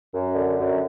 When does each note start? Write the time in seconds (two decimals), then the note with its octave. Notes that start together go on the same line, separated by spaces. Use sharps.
0.13 F#2
0.35 D3
0.58 F#2